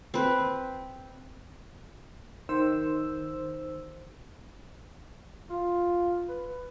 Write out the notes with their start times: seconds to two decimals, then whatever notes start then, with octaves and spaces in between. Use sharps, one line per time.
0.14 C4 B4
2.49 D#3 C5 E6
5.50 F4
6.29 B4